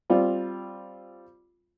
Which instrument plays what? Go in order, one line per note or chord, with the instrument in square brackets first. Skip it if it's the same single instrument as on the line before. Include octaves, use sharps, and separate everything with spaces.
[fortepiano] G3 C4 F4